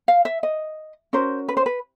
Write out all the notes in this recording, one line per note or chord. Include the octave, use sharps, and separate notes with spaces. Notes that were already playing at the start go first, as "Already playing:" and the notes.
F5
E5
D#5
C#4 F#4 A#4 C5
B4
C5
B4